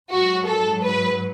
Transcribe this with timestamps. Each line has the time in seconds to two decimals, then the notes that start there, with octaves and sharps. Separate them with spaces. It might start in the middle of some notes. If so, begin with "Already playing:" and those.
0.10 G#2 F#3 F#4
0.46 A4
0.82 B4